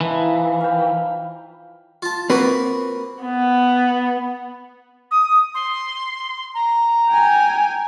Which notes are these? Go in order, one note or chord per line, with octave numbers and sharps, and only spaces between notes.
E3 F3 D#4 E4
F5 G5
F4 A5
A#3 C4 F#4 A#4 B4
B3
D#6
C6
A#5
G5 G#5